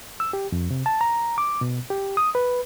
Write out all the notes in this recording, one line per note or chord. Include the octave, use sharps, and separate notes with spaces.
E6
G4
F2
C3
A5
A#5
D6
B2
G4
D#6
B4